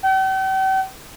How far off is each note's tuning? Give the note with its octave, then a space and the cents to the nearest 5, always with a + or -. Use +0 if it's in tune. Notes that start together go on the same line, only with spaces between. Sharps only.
G5 -45